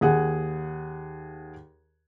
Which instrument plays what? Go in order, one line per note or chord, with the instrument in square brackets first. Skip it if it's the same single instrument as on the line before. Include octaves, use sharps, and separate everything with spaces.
[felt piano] D#2 G#4 F#5